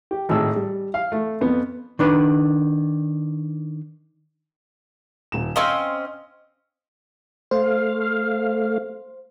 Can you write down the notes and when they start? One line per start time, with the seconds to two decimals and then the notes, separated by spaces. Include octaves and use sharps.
0.11 G4
0.29 G#1 A2 G#4 E6
0.56 G3
0.94 F5
1.12 A3
1.41 F2 B3
1.99 D#3 D4 B4
5.32 D#1 E7
5.56 C4 C#4 D#5 F5 C6
7.51 A3 C5 F5